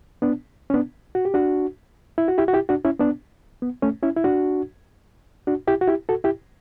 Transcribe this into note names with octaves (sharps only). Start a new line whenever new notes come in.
B3 D4
C#4
B3 D4
F#4
G4
D4 F#4
E4
F#4
E4 G4
F#4
E4 G4
D4 F#4
C#4 E4
B3 D4
B3
A3 C#4
C#4 E4
E4
D4 F#4
D4 F#4
E4 G4
F#4
E4 G4
F#4 A4
E4 G4